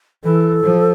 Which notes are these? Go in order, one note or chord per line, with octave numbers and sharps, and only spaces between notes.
E3 A4
F3